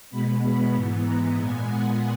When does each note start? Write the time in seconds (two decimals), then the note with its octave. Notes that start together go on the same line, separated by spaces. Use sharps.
0.10 B2 G#3 B3 B5
0.42 B5
0.74 G#2 E3 B3
1.05 A#5
1.36 A#2 G#3 B3 G#5
1.68 F#5